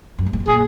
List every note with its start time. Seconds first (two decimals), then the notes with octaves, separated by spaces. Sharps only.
0.18 F#2
0.26 G2
0.33 G#2
0.40 A2
0.47 A#2 G#4